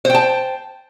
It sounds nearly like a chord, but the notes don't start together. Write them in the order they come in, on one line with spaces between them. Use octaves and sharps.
C5 G5 A5